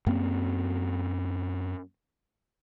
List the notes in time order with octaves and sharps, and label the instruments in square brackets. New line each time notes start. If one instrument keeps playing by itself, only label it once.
[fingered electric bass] F#2 A#3 C4